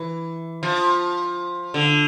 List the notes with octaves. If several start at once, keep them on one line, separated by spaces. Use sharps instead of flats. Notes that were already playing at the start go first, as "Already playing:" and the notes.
Already playing: E3
F3
D3